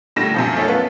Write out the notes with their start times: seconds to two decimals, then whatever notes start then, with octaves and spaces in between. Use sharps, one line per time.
0.16 A2 D3 G3 A#6 E7
0.34 F#2 C3 F3
0.57 A3 C#4 A4
0.68 B3 F4